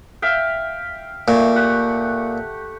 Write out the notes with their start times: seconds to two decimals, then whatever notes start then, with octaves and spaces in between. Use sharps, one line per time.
0.22 E5 F5 G5
1.28 A#2 A3
1.55 G4 F#5